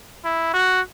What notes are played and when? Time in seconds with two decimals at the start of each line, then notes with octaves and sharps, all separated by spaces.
0.25 E4
0.54 F#4